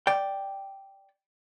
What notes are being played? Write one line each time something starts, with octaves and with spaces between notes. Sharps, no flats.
D5 G5